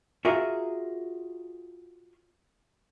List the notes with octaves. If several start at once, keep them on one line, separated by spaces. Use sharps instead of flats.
F4 F#4 G#4 A#4 E5